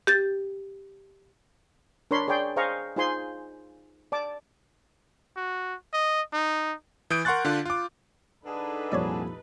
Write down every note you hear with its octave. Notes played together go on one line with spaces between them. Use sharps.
G4 G6 A6
D4 A#4 C#5 D5 B5 C6
G#4 C#5 D5 G5 C6
G#4 C5 D#5 F5 A#5 C#6
D#4 F4 G#4 C5 G#5 C6
D5 A5 D6
F#4
D#5
D#4
E3 D#6 G6 D7
A#4 F#5 C6 C#6 F#6 A6
D3 D4 F4
F4 D6
D3 D4 D#4 G#4 A4 B4
C2 F2 A#2 C#5 D5 E5